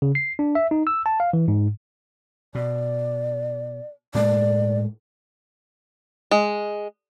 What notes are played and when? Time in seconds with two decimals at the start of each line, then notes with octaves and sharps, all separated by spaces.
0.02 C#3
0.15 C7
0.39 D4
0.55 E5
0.71 D#4
0.87 E6
1.06 A5
1.20 F5
1.33 E3
1.48 G#2
2.55 B2 D5
4.15 A2 G#3 A#3 D5
6.31 G#3